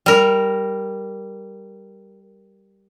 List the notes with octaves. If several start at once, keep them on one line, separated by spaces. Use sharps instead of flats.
G3 A#4